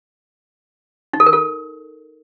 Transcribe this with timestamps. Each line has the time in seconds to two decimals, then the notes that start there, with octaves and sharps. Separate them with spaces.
1.13 D#4
1.20 A4
1.26 A#4
1.33 A4